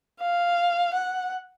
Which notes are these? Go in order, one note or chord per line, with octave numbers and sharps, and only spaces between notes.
F5
F#5